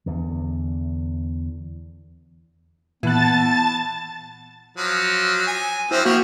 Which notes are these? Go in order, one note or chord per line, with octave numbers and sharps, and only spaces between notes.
E2 D3
A#2 E3 B3 A5 F#6 A6
F3 F#3
G#5
F3 F#3 C4 E4 C5
F3 A#3 E4 F#4 C#5 G5